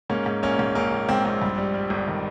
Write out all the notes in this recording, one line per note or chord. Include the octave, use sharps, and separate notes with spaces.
G#2 A#3 C#4
G#2
A#1 A#3 C#4
G#2
A#1 A#3 C#4
A#1
G#2 C4
A#1 C4
G2
G3
G3
G1
D#3